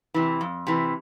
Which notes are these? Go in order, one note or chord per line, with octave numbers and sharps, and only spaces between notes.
C3 E3
F2
C3 E3